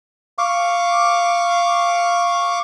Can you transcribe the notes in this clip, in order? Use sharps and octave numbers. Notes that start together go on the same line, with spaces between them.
F5 C#6 D6